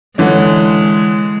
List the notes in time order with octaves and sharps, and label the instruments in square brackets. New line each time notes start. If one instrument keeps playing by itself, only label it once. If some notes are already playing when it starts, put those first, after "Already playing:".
[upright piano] D3 E3 C#4 [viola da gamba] G#3